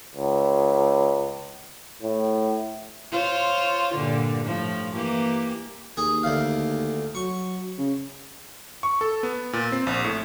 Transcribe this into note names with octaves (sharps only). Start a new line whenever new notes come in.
C#2
A2
F4 C5 C#5
G2 A#2 D3
A2 F3
E3 A#3 G4
D#2 G#4
D2 F5
F#3 C#6
C#3
C#6
A4
B3
A#2
C4
A#1
A2